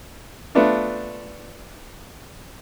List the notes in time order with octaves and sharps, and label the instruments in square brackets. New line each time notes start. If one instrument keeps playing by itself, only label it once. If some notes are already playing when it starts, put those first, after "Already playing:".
[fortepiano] A3 B3 D4 F4